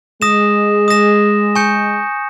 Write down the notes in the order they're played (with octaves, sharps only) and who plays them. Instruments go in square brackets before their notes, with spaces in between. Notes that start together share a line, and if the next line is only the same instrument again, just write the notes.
[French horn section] G#3 [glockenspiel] D#6 A#6 E7
[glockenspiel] D#6 A#6 E7
G#5 C#6 G6 C#7